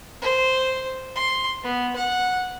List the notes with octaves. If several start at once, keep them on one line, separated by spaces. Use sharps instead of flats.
C5
C6
B3
F#5